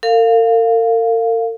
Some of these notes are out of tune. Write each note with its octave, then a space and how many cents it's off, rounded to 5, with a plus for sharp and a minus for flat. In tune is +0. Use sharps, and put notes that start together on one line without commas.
A#4 -45 F5 +0